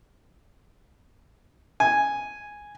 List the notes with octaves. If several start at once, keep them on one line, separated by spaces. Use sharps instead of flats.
G#5